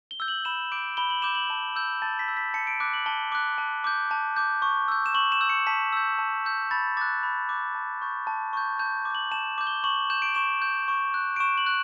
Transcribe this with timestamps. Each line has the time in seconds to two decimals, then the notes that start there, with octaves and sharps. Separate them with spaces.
0.11 G7
0.20 E6 G6
0.28 F#7
0.45 B5 E7
0.72 D6 G6 D7
0.97 B5 G7
1.10 F#7
1.22 D6 G6 E7
1.35 F#7
1.50 A5
1.76 E6 G6
2.02 A5 A6
2.19 B6
2.28 E6 G6
2.37 B6
2.54 A5 C#7
2.67 D7
2.80 D6 F#6
2.94 F#7
3.06 A5 G7
3.32 D6 F#6
3.58 A5
3.84 D6 G6
4.11 A5
4.36 D6 G6
4.62 C#6
4.88 E6 G6
5.06 E7
5.14 C#6 F#7
5.32 E7
5.41 E6 G6
5.49 C#7
5.67 A5 B6
5.93 E6 G6
6.19 A5
6.45 E6 G6
6.71 B5 A6
6.97 D6 F#6 A6
7.23 B5
7.49 D6 F#6
7.75 A5
8.02 C#6 G6
8.27 A5
8.53 C#6 G6
8.79 A5 G6
9.05 D6
9.10 G6 F#7
9.32 A5 E7
9.58 D6 G6
9.67 G7
9.84 C#6 F#7
10.10 G6 E7
10.22 D7
10.35 C#6 E7
10.62 G6
10.88 C#6
11.14 F#6
11.36 D7
11.40 C#6 E7
11.58 F#7
11.66 F#6